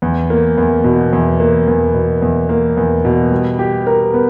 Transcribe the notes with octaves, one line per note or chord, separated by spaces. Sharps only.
E2
A#3
E2
B2
E2
A#3
E2
B2
E2
A#3
E2
B2
G3
G4
A#4
B3